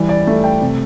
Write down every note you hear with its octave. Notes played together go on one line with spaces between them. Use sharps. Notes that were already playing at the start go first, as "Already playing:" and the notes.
Already playing: E3 G3
D5
A3
G5
C3